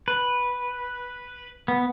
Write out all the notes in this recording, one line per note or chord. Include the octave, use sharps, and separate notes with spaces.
B4
B3